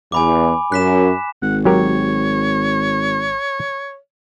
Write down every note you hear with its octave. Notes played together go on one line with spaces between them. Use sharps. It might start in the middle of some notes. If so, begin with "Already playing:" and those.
E2 G#5 B5 D6
F#2 F#6 B6 E7
G#1 F#5
F#3 G4 A#4 C#5